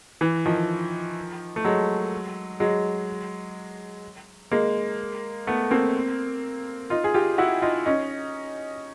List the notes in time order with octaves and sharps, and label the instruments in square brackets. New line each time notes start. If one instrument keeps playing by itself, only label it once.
[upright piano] E3
D#3 F3
A3
F#3 G#3
F#3 G#3
G#3 A#3
A3 B3
A#3 C4
D#4 F4
G#4
F4 G4
E4 F#4
D#4 F4
C#4 D#4